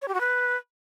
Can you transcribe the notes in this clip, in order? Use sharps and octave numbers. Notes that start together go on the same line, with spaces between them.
C#5
G4
F#4
B4